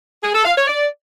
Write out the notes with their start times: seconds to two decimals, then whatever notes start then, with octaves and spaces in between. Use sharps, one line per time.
0.23 G#4
0.34 A4
0.45 F5
0.56 C#5
0.68 D5